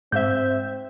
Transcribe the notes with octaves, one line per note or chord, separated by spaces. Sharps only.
G#2 C4 E5 G6